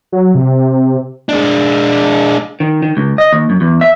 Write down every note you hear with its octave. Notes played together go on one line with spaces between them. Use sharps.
F#3
C3
G#3 D4
D#3
D#3
C#2
D#5
D#2
F#2
E2
E5